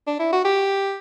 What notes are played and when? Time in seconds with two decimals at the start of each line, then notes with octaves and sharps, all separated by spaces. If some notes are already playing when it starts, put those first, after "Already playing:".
0.07 D4
0.20 E4
0.33 F#4
0.45 G4